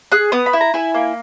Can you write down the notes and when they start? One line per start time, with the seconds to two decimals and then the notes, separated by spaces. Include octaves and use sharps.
0.12 G#4 F#6
0.32 B3 D#6
0.46 B5
0.53 E4
0.61 A#5
0.74 E4 G#5
0.94 A#3